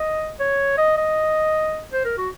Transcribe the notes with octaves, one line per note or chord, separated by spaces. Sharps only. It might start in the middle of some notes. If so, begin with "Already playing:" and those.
Already playing: D#5
C#5
D#5
D#5
C5
A#4
F#4